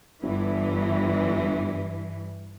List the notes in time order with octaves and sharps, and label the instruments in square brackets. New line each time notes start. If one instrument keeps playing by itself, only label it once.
[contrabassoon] G1 [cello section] G2 E3